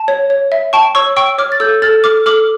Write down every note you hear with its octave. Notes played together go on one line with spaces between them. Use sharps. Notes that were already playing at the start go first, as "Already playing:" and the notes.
Already playing: A5
C#5
C#5
E5
G5 A5 C#6
C#5 C#6 E6
G5 C#6 E6
C#5 D6 F6
A6
A4 E6 G6
A4 F6 A6
A4 D6 F6
A4 D6 F6